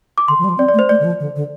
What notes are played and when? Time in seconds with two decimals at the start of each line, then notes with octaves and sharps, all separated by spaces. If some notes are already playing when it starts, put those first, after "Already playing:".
0.18 D6
0.28 D3 C6
0.39 F3
0.44 G3
0.49 F3
0.58 C4 D5
0.68 D5
0.74 A3
0.79 C5
0.89 A3 D5
1.00 D3
1.04 F3
1.20 D3
1.36 D3